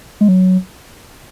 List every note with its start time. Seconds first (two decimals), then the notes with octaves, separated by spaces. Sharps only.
0.21 G#3
0.28 F#3